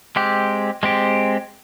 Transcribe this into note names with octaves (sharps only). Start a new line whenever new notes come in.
G#3 C4 G4
G#3 C4 G4